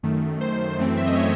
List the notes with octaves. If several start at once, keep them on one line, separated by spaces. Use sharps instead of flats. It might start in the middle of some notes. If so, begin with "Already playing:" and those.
F#2 D#3 A3
C5
F#2 E3 A3 C4
E5
D#5
C#5